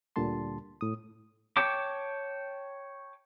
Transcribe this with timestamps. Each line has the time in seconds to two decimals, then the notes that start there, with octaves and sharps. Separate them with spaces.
0.16 D2 A#2 D3 G3 A5 C6
0.81 A2 D#6
1.57 C#5 G5 A5 D6